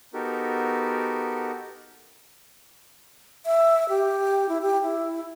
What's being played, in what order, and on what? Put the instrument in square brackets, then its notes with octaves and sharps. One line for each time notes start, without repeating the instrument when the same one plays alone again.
[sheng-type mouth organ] B3 D#4 F#4 G4 A4 A#4
[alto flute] E5
G4
E4
G4
E4